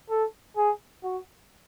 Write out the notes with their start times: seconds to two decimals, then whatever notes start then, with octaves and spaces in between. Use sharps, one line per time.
0.10 A4
0.57 G#4
1.04 F#4